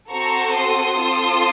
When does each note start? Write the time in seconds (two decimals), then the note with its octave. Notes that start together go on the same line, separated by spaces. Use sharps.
0.11 C4 F#4 A4 A#5 C#6
0.55 C6 D#6
1.00 C4 F4 A4